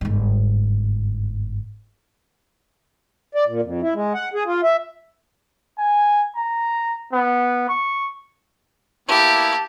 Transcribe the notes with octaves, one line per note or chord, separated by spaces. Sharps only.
G1 G#2
D5
A#2
F2
E4
G#3
F#5
G#4
F4
E5
G#5
A#5
B3
C#6
A#3 B3 E4 G4 A5